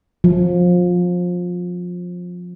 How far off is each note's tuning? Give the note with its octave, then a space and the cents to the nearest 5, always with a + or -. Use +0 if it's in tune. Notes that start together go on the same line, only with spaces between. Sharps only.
F3 +25